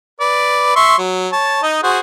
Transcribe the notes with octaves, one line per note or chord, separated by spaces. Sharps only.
B4 D5
E5 C6 C#6
F#3
C#5 A5
D#4 D#5
F#4 G#4 C5